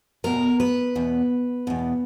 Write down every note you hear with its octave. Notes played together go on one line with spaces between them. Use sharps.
E2 B2 A#4
B4
E2 B2
E2 B2